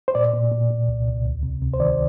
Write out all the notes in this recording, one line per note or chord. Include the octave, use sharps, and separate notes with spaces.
C5
A#2 D5
A#2
A#2
A#2
C2
C2
D2
C3
C3
C5
D#3 D5